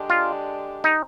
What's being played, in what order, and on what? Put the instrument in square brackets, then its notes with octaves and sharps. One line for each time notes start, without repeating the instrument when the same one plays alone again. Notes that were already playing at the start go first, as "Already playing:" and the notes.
Already playing: [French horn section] D3 G#3 D4 G4
[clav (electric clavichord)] F4
D#4